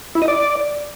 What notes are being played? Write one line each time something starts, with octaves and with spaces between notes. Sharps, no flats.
E4
D#5
D5